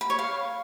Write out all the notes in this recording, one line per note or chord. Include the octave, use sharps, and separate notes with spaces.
B5
C#5
F5